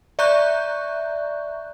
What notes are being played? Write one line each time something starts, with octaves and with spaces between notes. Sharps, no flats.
D5 E5 A#5 C#6 F#6 G6